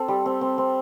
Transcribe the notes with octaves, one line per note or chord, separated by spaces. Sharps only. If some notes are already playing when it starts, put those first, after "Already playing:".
Already playing: C4 A4
G3
C4
C4
C4